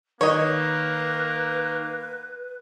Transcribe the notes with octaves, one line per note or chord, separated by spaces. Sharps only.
D#3 A#3 B4 C#5 D#5